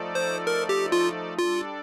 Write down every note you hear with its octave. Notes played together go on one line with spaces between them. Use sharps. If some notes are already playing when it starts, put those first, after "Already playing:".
Already playing: F3 A3 D#4 A4 D5
C5
A#4
G4
F4
G3 D4 F4 A4 D5